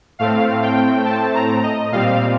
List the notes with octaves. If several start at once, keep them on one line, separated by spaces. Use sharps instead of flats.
A2 A3 C4 F5
G5
A5
A#5
D#5
A#2 G3 C4 F5